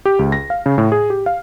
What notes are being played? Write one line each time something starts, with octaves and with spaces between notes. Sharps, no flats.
G4
C#2
A#6
F5
C#3
A2
G#4
G4
F5